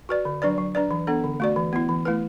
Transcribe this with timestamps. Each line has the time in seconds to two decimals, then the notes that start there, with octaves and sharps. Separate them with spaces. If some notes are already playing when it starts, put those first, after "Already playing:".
0.09 F#4 B4 D5
0.25 D3
0.42 F#3 D4 B4 D5
0.58 F#3
0.75 D4 B4 D5
0.91 E3
1.07 B3 D4 A4
1.24 D3
1.40 A3 F#4 D5
1.56 E3
1.73 B3 E4
1.89 E3
2.05 A3 E4 B4